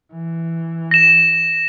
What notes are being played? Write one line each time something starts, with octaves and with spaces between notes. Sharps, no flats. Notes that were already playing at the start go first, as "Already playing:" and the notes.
E3
A#6 E7